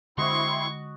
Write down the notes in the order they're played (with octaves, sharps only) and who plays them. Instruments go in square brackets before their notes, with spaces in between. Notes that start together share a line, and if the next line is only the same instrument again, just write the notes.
[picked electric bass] D3 G#3 [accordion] C4 E4 C6 [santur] F#4 D#5 [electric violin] C#6